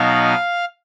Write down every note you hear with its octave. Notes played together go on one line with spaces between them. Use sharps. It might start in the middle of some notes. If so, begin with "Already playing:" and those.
Already playing: B2 F#3 B3 D#4 F5